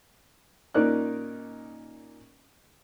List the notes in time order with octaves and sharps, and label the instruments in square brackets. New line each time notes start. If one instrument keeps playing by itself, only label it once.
[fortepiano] A#2 C#4 D#4 A#4 D5 F#6